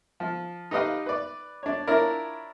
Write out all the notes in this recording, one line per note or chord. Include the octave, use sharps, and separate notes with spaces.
F3
D#4 G4 B4 D#5 F5
B4 D5
D4 C#5
D4 E4 F4 A#4 C#5 D5